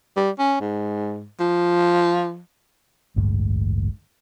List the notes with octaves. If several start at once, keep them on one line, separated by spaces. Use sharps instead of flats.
G3
C#4
G#2
F3
A1 D2 G2 G#3